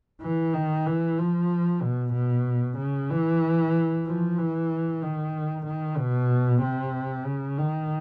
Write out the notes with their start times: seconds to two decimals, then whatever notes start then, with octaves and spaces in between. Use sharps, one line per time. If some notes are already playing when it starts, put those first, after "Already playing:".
0.22 E3
0.54 D#3
0.86 E3
1.18 F3
1.82 B2
2.14 B2
2.78 C#3
3.10 E3
4.06 F3
4.38 E3
5.02 D#3
5.66 D#3
5.98 B2
6.62 C3
7.26 C#3
7.58 D#3